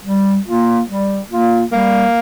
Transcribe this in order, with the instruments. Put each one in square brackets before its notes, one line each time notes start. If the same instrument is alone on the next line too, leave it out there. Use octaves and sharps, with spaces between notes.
[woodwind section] G3
A#3 F4
G3
A#3 F4
[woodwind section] G3 [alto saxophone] A#3